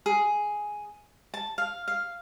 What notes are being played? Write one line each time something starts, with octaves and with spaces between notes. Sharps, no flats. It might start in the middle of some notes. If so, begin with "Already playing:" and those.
G#4
A5
F5
F5